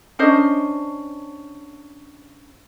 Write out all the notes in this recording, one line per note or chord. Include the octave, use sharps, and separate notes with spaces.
C#4 D4 C5 D#5